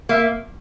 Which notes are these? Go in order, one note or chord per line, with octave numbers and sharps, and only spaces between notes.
A#3 E5